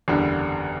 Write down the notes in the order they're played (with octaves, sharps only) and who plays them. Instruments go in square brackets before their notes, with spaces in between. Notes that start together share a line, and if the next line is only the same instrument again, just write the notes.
[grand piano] F#1 E2 D3 G3